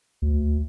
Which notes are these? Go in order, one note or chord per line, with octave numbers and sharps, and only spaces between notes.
D2